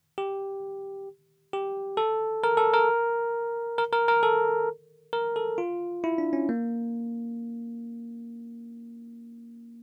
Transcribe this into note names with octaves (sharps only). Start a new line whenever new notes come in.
G4
G4
A4
A#4
A4
A#4
A#4
A#4
A#4
A4
A#4
A4
F4
E4
D4
C#4
A#3